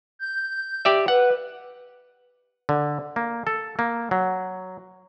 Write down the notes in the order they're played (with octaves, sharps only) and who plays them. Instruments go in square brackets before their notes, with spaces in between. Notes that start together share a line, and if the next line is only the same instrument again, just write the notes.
[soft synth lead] G6
[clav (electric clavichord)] G4 D5 E5
[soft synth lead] B4 [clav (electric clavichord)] F#5
[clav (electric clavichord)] D3
A#3
A4
A#3
F#3